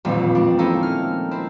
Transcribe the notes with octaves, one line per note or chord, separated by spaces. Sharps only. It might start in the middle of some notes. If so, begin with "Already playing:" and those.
D#1 A1 F2 F3 G3 C4
G#3 D4
A#3 C4 C#4 D#4 E4 A4
F6
C4 E4